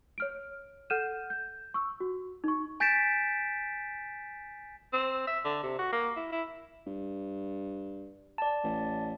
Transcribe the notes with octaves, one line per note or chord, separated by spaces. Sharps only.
C#5 F6 D7
A4 F#5 F6 G6 D#7 E7
G6
C#6 E6
F#4
D#4 C#6
G#5 G6 A6 B6 D7 E7
C4
E5
D3
C3
F#4
A#3
E4
E4
G2
D5 A5
A1